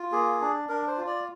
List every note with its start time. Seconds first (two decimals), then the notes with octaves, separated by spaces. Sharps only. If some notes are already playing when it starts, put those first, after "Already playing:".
Already playing: F4
0.12 A#3 G#4
0.41 D4
0.69 D4 A#4
0.88 C5
0.97 F4
1.07 D5